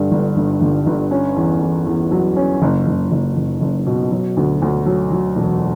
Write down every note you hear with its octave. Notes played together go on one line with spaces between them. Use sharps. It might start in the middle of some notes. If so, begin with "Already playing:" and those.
Already playing: G2 D3
G1
G1
G1
G1
C#4
E2
E2
E2
F#3
C#4
F#1
F#1
F#1
F#1
F#1
B2
F#3
D2
D2
F#3
F#3
E1